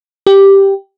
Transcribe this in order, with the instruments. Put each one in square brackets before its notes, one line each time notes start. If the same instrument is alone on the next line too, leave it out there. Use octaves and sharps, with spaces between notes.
[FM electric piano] G4